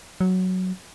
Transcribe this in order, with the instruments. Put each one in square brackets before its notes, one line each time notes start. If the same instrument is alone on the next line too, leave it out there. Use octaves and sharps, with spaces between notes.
[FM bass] F#3